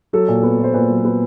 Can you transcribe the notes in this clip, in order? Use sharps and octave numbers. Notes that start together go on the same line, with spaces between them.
F#3 A4
A#2
B3
A#2 C5
A#2 B4
F#3
B3